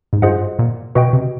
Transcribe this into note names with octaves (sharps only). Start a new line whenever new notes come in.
G#2
G2 F4 G#4 C5 D#5 F#5
A#2
B2 F#4 B4 D#5 G5
C3